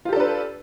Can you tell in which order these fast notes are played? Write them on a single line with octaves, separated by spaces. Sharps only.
F4 G4 A4 D4 B4